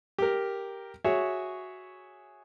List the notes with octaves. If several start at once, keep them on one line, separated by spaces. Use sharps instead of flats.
G4 A#4
F#4 G#4 C#5 E5